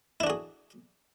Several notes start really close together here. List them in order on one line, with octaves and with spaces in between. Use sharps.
E4 D4 F#4 G#4